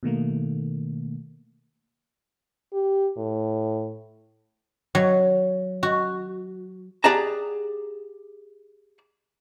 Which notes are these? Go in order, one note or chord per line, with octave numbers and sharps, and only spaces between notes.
B2 D#3 A3 A#3
G4
A2
F#3
F#4
G4 G#4 D5 F#5 A5 A#5